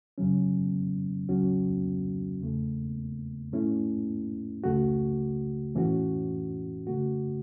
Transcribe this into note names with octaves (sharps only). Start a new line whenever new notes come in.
F#2 C#3 F#3 C#4
C#2 C#3 F#3 C#4 F#4
E2 C#3 A3
A2 A3 C#4 E4
C#2 C#3 A3 F#4
A2 E3 C#4 F#4
C#3 A3 F#4